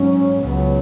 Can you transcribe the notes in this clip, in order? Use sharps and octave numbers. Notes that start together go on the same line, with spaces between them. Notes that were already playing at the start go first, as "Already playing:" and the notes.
Already playing: G#2 F#3 C#4
C#2 C#3 F#3 B3